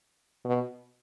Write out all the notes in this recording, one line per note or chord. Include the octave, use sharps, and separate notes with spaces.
B2